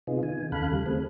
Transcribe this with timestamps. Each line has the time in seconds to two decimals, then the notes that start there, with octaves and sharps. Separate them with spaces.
0.07 C3 B3 D#4 F4 G#4
0.23 D#3 G#5
0.52 D#2 C#3 A4 F5 B5 F#6
0.72 G3
0.86 A3 C4 G#4